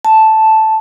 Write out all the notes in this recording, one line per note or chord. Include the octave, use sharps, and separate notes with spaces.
A5